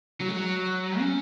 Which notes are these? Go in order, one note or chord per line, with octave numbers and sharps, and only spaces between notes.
F#3
G#3
F#3
C#4